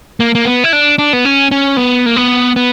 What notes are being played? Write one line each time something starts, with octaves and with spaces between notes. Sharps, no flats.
A#3
A#3
B3
E4
D4
D4
B3
C#4
C#4
B3
A#3
B3
B3